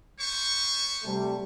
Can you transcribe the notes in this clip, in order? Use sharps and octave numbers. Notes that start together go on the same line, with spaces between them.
B3 C5 C#6
C3 G3 A3